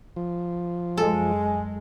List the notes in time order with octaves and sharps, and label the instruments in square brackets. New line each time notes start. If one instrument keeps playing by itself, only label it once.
[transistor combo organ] F3
[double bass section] F#2 G#3 [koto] A4 [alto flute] G#5